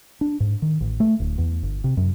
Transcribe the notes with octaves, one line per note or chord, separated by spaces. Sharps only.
D4
G#2
D#3
A1
A3
D1
E2
G1
C3
F#2